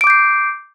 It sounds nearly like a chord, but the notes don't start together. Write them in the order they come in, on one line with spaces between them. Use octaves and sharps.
D7 D6 G6 C7